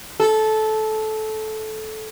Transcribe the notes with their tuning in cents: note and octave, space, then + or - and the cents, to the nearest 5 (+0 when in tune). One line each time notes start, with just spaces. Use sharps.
A4 -15